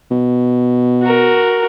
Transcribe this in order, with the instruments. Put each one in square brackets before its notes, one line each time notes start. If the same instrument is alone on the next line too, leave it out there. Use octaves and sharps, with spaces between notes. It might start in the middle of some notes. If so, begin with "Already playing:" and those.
[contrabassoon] B2
[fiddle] F#4 A#4